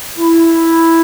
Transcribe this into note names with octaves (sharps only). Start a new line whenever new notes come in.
E4